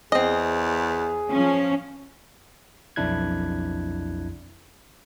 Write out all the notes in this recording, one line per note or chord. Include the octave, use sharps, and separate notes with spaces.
E2 C4 G#4 D#5
F3 C#4
B1 F2 D4 E4 F#6 G#6